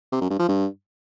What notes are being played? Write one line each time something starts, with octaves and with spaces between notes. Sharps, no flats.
C3
F#2
G2
F3
G2